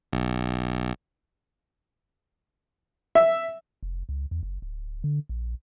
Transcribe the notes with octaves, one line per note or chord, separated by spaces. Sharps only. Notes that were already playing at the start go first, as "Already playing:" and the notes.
B1
E5
F1
C#2
E2
F#1
D1
D3
A#1